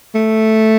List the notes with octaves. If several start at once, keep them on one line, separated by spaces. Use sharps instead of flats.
A3